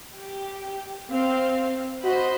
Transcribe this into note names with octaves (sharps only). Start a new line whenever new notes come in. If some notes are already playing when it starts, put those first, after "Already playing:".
G4
C4 F5
F#4 C5 D#5 B5